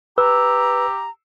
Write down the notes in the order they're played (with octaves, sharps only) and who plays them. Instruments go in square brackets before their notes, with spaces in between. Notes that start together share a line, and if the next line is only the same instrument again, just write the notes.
[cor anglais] G4 [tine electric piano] B4 [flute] A#5 [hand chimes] E6